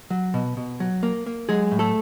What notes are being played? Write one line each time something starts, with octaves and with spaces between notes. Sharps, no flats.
F#3
B2
B2
F#3
A#3
A#3
F#3 G#3 G#4
A2
A3 A4